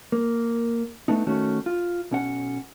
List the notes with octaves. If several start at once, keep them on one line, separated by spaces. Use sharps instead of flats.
A#3
A3 B3 D4 D#4
D#3 A3 C#4 F#4
F4
B1 C#4 F#5